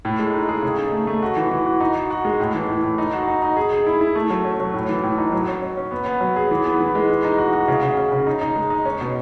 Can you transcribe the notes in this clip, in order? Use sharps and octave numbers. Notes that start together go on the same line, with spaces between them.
A2
G#3
D#4
G#4
C#3
D#4
A3
A3
F#4
E3
E3
F#4
D#4
F#4
F#4
G#3
A2
E3
A2
A2
D#4
F#4
D#4
D#4
G#4
G#4
E4
E4
A3
F#3
C#4
F#3
A2
E3
A2
D#4
F#3
C#4
C#4
C#4
B3
B3
F#3
G#4
E3
B3
E3
G#3
E3
D#4
F#4
F#4
C#3
C#3
C#3
C#3
D#4
D#4
G#3
D#4
C#4
B2